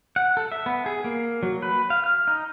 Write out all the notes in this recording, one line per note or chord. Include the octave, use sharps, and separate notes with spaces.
F#5
A4
E5
B3
G#4
A#3
F#3
B4
F5
F6
D#4